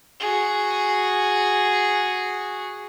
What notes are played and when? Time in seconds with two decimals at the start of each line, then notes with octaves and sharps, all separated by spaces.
0.20 F#4 G#4